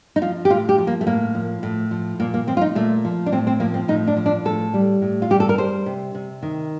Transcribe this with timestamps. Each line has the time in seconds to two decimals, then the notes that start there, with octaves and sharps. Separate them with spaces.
0.16 D#4
0.21 F3 F4
0.45 G4
0.50 A2 F4
0.69 G4
0.78 F3
0.87 A#3
1.01 A3
1.07 A2 A#3
1.35 F3
1.63 A2
1.91 F3
2.20 A#2 A#3
2.34 A#3
2.47 F3 C4
2.57 F4
2.61 D#4
2.75 A#2 A3
3.05 F3
3.26 D4
3.32 A2 C4
3.47 C4
3.60 F3 A#3
3.74 C4
3.88 A2 D#4
4.07 D4
4.17 F3
4.26 D4
4.45 A2 A4
4.74 G3
5.02 A2
5.22 F4
5.30 G3 G4
5.40 A4
5.49 A#4
5.58 G3 C5
5.86 C3
6.15 C3
6.43 D#3